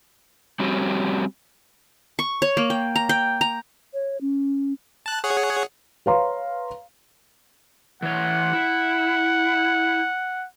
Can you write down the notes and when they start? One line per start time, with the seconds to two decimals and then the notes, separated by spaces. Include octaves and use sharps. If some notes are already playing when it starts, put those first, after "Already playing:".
0.60 G3 C4 C#4 F#4 G4
2.19 C#6
2.42 C#5
2.57 A#3
2.70 G5
2.96 A#5
3.09 G5
3.41 A#5
3.94 C#5
4.21 C#4
5.06 A5 F#6
5.24 G#4 C#5 F#5
6.06 B4 C#5 F5 A#5 C6
8.02 E3 C#5 F#5
8.53 E4